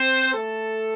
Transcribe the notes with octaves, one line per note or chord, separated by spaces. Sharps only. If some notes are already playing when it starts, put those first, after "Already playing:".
Already playing: C4 C5
A3 A4